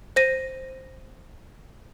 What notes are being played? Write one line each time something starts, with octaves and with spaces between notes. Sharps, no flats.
C5 A#6 D#7